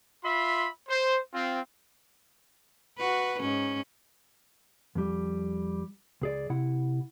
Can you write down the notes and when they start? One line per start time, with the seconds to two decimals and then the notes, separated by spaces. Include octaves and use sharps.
0.23 F4 E5 B5 C6
0.88 C5
1.34 C4 F4
2.98 F#4 B4
3.40 G#2 C#4
4.95 F2 G3
6.22 C#2 G#4 D5
6.50 C3 E4 F#5